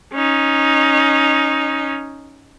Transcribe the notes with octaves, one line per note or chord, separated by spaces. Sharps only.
C#4 D#4